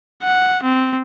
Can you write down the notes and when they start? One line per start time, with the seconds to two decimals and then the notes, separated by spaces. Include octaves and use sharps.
0.23 F#5
0.63 C4